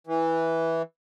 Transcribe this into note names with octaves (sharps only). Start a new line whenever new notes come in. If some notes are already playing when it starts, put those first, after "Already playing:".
E3